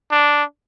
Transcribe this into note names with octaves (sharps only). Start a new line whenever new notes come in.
D4